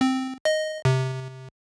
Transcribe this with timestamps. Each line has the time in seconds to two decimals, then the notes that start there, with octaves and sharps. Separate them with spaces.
0.01 C4
0.45 D#5
0.85 C3